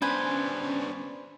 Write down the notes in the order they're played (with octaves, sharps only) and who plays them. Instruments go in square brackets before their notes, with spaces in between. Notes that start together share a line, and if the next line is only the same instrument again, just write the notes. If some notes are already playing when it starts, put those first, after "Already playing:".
[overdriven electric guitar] B3 D4 [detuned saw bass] C#4 [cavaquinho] B4 C5 G#5